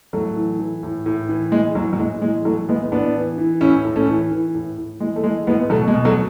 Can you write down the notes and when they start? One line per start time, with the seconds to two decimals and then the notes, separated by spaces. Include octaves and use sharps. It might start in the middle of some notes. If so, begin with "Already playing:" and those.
0.13 A2 F#3 A3
0.36 E3
0.59 E3
0.83 A2
1.06 A2
1.29 E3
1.52 E3 G#3
1.75 A2 F#3
1.93 F#3
1.99 A2 G#3
2.21 E3 G#3
2.45 E3 F#3 A3
2.68 A2 G#3 B3
2.92 A2 B3 D4
3.15 E3
3.38 E3
3.61 A2 C#4 E4
3.85 A2
3.96 A3 C#4
4.08 E3
4.31 E3
4.55 A2
4.78 A2
5.00 E3 G#3
5.16 A3
5.23 E3 G#3
5.47 A2 G#3 B3
5.70 B2 F#3 A3
5.88 G#3
5.94 B2
6.05 F#3 A3